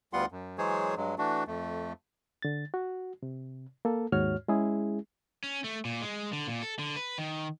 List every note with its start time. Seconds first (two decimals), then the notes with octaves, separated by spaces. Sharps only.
0.13 D2 G3 B3 F4 F#5 C6
0.32 F#2
0.58 E3 F#3 G#3 G#4 C5 C#5
0.97 G2 F#3 G#3
1.18 E3 A3 D4 F#4
1.47 F2 A3
2.42 D3 A6
2.74 F#4
3.23 C3
3.85 A#3 A4
4.12 D#2 G#2 F#4 C#5 F6
4.48 G#3 C#4 E4 G#4
5.44 C#4
5.64 A3
5.85 A#2
6.02 G#3
6.33 D3
6.48 A#2
6.63 A4
6.79 D3
6.96 B4
7.18 D#3